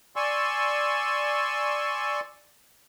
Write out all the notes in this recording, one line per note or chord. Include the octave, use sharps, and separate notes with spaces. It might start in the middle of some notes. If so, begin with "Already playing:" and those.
D5 G#5 C6 C#6 E6